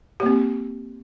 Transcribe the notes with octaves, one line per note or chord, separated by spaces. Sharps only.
A#3 C4 G4